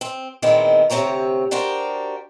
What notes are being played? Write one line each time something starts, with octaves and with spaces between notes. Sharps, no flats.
C4
A#2 D#3 E3 G#3 B3 C4
D2 C3 A#3 C4 C#5 A#5
D4 F#4 G4 A#4 C5